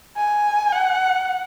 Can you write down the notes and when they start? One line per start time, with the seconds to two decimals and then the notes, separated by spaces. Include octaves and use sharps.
0.17 G#5
0.73 F#5